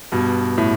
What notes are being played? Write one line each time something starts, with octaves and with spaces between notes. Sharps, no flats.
G2 B2
A2